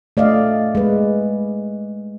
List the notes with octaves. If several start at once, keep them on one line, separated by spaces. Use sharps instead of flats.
A3 D5 D#5 F5
G#3 B4